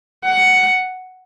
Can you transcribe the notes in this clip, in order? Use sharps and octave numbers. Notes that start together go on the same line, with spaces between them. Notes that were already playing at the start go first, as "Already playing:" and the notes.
F#5